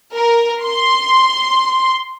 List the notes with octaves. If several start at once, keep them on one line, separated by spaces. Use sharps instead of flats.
A#4
C6